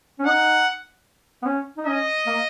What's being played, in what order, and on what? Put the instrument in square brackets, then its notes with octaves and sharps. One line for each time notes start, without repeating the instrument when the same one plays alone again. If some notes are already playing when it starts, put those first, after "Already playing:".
[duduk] C#4
[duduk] D#4 [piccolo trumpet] F#5
[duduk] B3
C#4
D#4
[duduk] C#4 [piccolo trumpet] D#5
[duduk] A#3